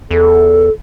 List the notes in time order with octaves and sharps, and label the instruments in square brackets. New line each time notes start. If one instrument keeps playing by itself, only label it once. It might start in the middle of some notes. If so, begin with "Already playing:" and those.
[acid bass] E2 [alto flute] A4